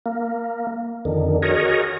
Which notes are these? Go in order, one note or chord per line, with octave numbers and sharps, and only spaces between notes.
A#3
F2 D3 D#3
F#4 G#4 A#4 C#5 D#5